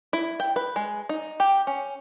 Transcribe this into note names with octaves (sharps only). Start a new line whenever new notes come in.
E4
G5
B4
G#3
D#4
G4
C#4